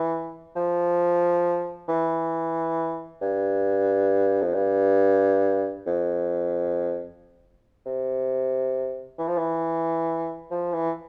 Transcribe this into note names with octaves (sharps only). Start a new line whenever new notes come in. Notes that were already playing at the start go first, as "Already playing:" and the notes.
Already playing: E3
F3
E3
G2
F2
G2
F2
C3
E3
F3
E3
F3
E3